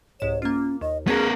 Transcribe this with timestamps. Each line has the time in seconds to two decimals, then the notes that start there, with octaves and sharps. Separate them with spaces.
0.20 C2 G#2 C#5 E7
0.42 A#3 C#4 F4
0.81 D#2 D#5
1.08 B3 C#4 F#4 G#4 A#4